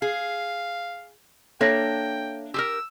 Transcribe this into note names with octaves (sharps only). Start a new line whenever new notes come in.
G#4 F5
A#3 D4 A4 C#5 E5 G5 A#6
G4 G#4 A#4 E6